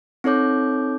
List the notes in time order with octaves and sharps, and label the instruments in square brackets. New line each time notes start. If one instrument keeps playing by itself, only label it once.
[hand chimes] C4 D#4 A4 C#5 D6 G6